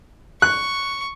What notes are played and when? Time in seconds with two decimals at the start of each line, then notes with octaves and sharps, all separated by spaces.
0.42 C#6 F#6